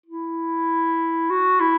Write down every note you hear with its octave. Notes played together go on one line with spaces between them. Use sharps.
E4
F#4
E4